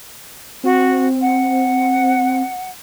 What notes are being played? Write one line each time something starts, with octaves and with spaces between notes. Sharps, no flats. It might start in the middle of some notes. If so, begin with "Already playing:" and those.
C4 F#4
F#5